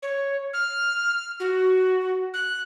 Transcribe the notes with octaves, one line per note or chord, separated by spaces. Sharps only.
C#5
F6
F#4
F#6